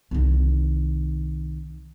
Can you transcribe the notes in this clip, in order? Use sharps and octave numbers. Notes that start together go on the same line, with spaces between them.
C2 D#3